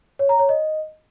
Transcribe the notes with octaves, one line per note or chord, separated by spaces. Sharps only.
C#5
A#5
C#5
D#5